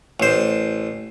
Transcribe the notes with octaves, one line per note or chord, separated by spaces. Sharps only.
A1 C5